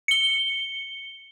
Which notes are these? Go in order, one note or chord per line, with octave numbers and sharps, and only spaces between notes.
C#7 G7